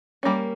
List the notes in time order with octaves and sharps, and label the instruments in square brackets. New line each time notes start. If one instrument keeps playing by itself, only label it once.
[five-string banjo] G3 A#3 C#4